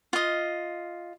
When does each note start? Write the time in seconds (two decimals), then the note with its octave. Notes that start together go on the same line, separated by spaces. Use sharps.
0.13 F4 D#5